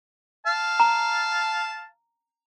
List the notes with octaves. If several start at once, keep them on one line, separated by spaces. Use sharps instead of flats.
F5 A5
A#5